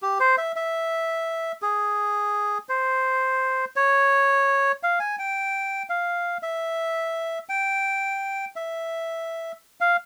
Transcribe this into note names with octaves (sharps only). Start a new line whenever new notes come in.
G4
C5
E5
E5
G#4
C5
C#5
F5
G#5
G5
F5
E5
G5
E5
F5